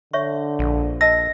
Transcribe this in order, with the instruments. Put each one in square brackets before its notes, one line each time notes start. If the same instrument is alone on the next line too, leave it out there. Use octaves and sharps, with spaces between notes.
[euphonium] D3 [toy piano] C#5 E5 C#6
[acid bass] A#1
[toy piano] D#5 A5 E6 [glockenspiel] A#6